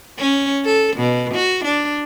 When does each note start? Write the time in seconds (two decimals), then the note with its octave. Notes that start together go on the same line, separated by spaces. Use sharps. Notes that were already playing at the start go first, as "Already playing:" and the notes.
0.19 C#4
0.65 A4
0.96 B2
1.34 F#4
1.65 D4